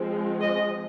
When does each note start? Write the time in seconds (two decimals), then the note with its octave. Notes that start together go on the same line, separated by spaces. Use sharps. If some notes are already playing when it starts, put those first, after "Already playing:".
Already playing: F3 G#3 C4
0.40 D#5